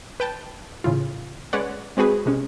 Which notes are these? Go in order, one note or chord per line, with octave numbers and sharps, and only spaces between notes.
B4 G5 A5
A2 C#3 E3 F4
G#3 C#4 B4 C#5 D5 F#5
G#3 C4 F#4 G#4 B4
C3 G#3 C#4